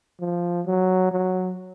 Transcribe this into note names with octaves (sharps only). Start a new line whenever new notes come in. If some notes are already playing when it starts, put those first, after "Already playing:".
F3
F#3
F#3